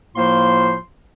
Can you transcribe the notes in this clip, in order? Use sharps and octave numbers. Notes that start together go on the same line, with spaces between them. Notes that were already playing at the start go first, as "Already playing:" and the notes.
A2 F3 A#3 F4 C5 C6